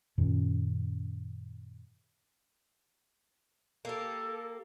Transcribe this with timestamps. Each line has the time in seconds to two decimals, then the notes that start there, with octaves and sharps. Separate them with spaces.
0.18 F#2 A#2 D#3 C#4
3.85 A#3 G4 A4